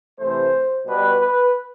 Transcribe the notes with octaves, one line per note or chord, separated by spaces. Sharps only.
C3 E3 A3 C5
B2 G3 B3 B4
B4